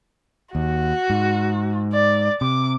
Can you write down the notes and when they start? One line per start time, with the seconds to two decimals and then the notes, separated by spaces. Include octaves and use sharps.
0.55 D#2 F#4
1.10 G#2
1.93 D5
2.41 C3 D6